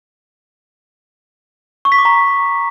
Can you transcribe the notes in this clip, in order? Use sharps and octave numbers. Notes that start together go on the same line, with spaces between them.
C#6
B6
D6
A#5